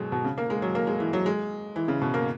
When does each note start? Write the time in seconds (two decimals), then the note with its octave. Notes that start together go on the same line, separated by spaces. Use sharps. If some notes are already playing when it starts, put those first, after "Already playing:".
Already playing: B2 F#3 G#3
0.12 B2
0.24 C#3
0.38 A#3
0.50 G#3
0.62 F#3
0.75 A#3
0.87 G#3
1.00 E3
1.13 F#3
1.26 G#3
1.76 E3
1.88 C#3
2.01 B2
2.14 A#3